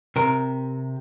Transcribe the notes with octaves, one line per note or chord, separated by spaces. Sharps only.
C3 A#4